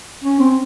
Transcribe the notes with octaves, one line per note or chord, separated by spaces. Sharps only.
C#4
C4